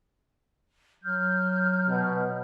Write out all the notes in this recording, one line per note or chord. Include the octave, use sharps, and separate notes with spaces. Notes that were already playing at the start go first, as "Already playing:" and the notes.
F#3 F6 G6
B2